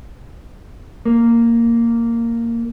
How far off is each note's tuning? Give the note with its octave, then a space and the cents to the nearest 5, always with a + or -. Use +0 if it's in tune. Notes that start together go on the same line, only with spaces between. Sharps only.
A#3 -10